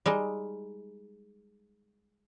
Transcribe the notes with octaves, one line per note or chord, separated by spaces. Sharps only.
G3 G#3 D#4